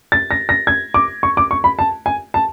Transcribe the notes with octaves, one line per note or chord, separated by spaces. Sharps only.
A6
A#6
A#6
G#6
D6
C#6
D6
C#6
B5
A5
G#5
A5